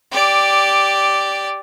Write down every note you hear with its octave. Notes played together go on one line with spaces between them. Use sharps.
G4 D5